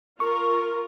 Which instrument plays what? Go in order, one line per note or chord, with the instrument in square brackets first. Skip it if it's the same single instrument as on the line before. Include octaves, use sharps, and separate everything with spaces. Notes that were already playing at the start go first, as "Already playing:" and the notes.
[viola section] F4 A#4 [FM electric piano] C#6